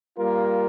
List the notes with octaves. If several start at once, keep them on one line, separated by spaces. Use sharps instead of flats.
G3 A#3 F4 A#4